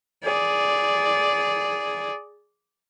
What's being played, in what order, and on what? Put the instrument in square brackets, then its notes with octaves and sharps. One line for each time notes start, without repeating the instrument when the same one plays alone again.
[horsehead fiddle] G#4 D5